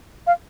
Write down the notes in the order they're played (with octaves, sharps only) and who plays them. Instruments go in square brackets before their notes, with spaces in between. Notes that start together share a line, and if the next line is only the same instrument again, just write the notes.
[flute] F5